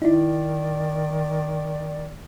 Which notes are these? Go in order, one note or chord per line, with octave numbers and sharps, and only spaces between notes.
D#3 D#4 E4 D5